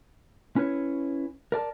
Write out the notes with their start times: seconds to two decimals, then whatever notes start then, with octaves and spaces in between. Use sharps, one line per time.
0.56 C#4 E4 B4 C#5
1.52 A#4 D5 A5